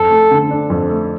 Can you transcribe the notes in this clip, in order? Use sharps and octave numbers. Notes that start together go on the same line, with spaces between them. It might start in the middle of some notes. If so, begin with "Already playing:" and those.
Already playing: F2 A4
A3
D3
D4
F2
A3